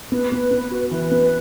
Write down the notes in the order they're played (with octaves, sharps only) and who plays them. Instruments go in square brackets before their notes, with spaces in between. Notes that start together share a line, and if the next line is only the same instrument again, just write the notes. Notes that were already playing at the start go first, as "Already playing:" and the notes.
[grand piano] B3 [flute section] B4
[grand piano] B3
B3
F#4
[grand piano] E3 [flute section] B4
[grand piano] B3